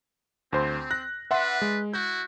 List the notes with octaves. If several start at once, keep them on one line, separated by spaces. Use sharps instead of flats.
D2 C4 C5 C6
F#6 A#6
D4 B4 E5 F#5 C6
G#3
E4 F#4 G6